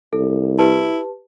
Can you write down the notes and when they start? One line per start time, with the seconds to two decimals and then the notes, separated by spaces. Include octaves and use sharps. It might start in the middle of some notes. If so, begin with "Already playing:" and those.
0.13 C2 A4
0.59 E4 G4 B4 A5